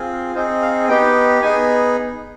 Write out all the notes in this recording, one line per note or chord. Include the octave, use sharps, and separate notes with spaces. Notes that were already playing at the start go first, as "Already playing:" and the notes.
Already playing: C4 F4 G#4
C4 D#4 G#4 C5
F5
B3 D#4 G4 G5
B3 D#4 G#4 G#5